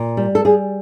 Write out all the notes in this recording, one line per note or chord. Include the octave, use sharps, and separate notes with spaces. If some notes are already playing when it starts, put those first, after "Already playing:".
Already playing: A#2
G3
A4
G3 G#4